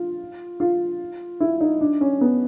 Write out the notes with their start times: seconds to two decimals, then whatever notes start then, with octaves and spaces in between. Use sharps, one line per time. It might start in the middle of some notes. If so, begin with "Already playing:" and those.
Already playing: F4
0.60 F4
1.40 E4
1.61 D#4
1.81 D4
2.01 C#4
2.21 B3